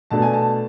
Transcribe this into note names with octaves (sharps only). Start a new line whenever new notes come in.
B2 A3 D4 A5
G#5
A5